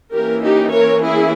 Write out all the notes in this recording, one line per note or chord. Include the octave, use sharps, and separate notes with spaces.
E3 A#3 C#4 G4 A#4
D#4 G4
A#4 C#5
E4 G#4